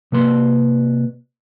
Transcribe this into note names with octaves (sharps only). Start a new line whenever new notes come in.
C3 A#3 B4 C6